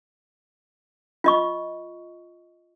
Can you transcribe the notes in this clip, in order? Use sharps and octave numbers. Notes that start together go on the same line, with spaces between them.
F4 D#5 C#6